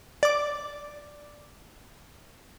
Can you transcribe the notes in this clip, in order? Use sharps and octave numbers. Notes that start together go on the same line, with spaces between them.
D5 D6